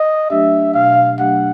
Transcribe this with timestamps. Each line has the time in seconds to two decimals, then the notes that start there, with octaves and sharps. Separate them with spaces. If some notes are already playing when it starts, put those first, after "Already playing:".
Already playing: D#5
0.30 F#3 A3 D4 G4 E5
0.74 B2 F5
1.19 F#3 A3 D4 G4 F#5